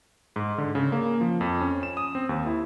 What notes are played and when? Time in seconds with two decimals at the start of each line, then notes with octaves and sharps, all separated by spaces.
0.36 G#2
0.58 D3
0.75 C#3
0.92 A#3
1.21 F3
1.41 F2
1.61 C#4
1.83 E7
1.97 D#6
2.15 C4
2.29 D#2
2.46 E4